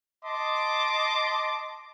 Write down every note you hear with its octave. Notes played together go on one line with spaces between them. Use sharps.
D#5 A5 C6 D6